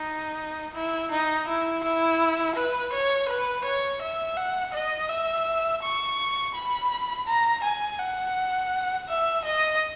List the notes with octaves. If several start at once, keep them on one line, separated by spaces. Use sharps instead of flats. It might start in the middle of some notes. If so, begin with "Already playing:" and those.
Already playing: D#4
E4
D#4
E4
E4
B4
C#5
B4
C#5
E5
F#5
D#5
E5
C#6
B5
A#5
G#5
F#5
E5
D#5